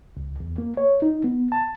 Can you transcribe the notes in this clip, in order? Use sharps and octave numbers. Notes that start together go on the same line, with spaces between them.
C#2
E2
A#3
C#5
D#4
B3
A5